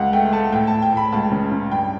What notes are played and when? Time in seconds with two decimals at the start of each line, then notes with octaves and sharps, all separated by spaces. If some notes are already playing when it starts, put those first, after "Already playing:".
Already playing: C#2 F#5
0.13 A3 G5
0.33 A3 A5
0.52 A2 G5
0.67 A5
0.73 A2
0.82 G5
0.92 A2 B5
1.12 C#2 A5
1.32 C#3
1.52 C#3
1.71 G2 G5